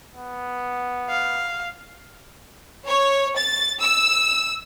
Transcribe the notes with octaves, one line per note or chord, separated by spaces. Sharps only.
B3
F5
C#5
A6
E6